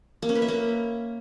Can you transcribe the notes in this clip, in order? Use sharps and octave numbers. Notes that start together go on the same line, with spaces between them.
A#3
C#4
B4
E5
A#3